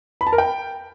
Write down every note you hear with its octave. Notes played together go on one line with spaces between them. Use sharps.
B5
A5
A#4
G5